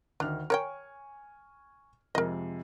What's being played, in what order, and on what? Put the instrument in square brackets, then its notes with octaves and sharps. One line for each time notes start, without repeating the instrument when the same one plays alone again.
[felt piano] D2 D#3 F6 [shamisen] D4
[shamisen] A#4 C#5 G5 [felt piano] G#5 C#6
[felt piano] F2 C3 G#3 [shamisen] A#4 D#5